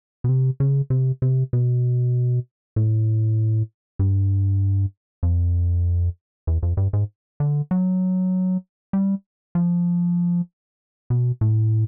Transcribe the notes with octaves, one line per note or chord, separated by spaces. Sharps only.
B2
C3
C#3
C3
C3
B2
A2
G2
F2
E2
F2
G2
G#2
D3
F#3
G3
F3
B2
A2